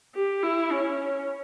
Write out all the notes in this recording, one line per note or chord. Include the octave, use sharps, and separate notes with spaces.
G4
E4
C#4